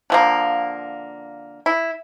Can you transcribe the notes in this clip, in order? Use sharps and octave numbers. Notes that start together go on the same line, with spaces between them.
D3 F3 A#3
E4